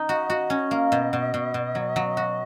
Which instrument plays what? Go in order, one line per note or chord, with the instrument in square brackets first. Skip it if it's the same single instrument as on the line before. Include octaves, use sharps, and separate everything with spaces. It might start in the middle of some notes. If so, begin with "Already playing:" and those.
Already playing: [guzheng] D#4
[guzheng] F#4 [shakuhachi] D#5
[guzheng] F#4
C#4
A#3
B2
B2
B2
B2
F#3
F#3
F#4